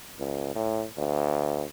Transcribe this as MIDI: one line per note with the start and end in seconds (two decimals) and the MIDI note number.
0.19 0.54 37
0.55 0.84 45
0.98 1.64 38